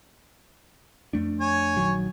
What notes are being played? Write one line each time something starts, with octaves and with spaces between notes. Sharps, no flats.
F2 A3 D4
C#5 G#5
A#1 D#3 F#3